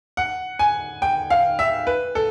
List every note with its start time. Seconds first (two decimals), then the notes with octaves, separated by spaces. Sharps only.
0.17 F#5
0.59 G#5
1.02 G5
1.30 F5
1.59 E5
1.87 B4
2.15 A4